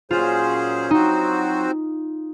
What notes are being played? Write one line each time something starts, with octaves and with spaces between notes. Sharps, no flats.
A#2 F#3 C#4 F4 G#4 C5
F#3 C4 D#4 F#4 C5